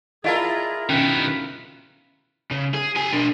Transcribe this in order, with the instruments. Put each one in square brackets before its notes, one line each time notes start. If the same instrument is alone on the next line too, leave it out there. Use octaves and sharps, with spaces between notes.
[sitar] E4 F4 A#4 [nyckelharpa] G#4 A#5 [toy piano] D5 D#5 A5
[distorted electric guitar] B2 D#3 [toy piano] C#4 D4 [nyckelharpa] B4
[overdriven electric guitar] C#3
G#4
G4 G#5
D4 A#4